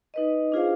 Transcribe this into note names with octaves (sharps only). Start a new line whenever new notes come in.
D#4 B4 D#5
D4 F4 G#4 C5 F5